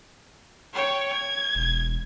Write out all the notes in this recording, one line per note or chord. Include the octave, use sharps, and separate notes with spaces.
C#5 G5
G#6
E1